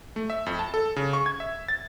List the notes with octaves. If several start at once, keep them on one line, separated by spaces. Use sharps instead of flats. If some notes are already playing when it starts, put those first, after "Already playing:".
A3
E5
F2
A5
A4
C#3
C#6
G#6
E5
A6